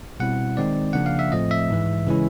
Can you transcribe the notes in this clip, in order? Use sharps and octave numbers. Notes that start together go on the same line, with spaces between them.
B2 G3 C4 E4 F#5
D#3 G#3 C4 D#4 D5
C#3 F3 A#3 D4 F#5
F5
E5
A2 F3 A3 C4 D#5
E5
G#2 E3 G#3
C#3 E3 G#3 C#4 E4